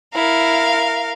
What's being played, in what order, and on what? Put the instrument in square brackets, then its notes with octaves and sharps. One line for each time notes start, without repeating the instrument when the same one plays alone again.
[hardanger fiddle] E4 [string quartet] A#4 F5